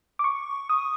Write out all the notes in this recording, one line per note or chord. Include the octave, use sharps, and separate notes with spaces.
D6
C#6
D#6